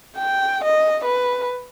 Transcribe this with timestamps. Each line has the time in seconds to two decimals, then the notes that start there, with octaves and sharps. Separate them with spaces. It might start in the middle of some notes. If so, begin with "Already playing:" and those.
0.17 G5
0.65 D#5
1.05 B4